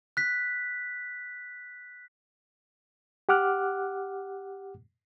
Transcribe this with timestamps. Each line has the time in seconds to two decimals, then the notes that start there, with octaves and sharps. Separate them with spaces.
0.17 F#6 B6
3.29 G4 F#5 D6 F6 F#6